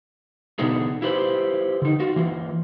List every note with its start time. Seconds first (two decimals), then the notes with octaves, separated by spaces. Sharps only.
0.59 B2 D3 B3 D4 D#4 G#4
1.02 E4 F4 G4 B4 C5
1.82 D3 D#4
2.00 F4 F#4
2.16 E3 A#3 F4